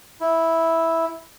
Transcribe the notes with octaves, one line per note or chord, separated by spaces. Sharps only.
E4